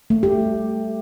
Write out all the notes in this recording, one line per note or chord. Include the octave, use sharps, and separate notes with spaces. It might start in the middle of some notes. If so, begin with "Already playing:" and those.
A3
G4